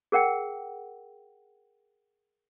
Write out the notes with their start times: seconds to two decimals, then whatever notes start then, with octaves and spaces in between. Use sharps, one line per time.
0.12 G#4 A#4 F#5 G5